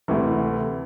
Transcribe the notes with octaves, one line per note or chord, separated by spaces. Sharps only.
D2 C3 E3 A3